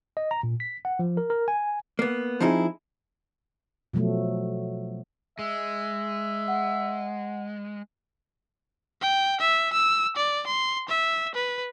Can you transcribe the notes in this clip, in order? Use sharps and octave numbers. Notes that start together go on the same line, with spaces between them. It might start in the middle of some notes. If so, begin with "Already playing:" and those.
D#5
A#5
A#2
B6
F#5
F3
A#4
A#4
G#5
A#3 B3
F3 C4 D#4 E4 G#4
B2 F3 F#3 A3
G#3 E5
F#5
G5
E5
E6
D5
C6
E5
B4